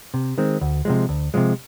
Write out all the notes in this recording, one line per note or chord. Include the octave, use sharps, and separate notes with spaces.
C3
D#3 G#3 C4
D2
C3 F3 G#3
D2
C3 F3 G#3